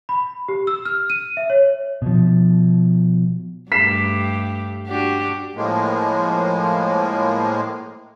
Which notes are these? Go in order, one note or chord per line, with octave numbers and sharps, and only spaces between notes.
B5
G4
E6
F6
D#7
E5
C#5
B2 F3
G2 A3 G4 B6 C7 E7
D4 F#4 G4
A2 F3 G#3 A#3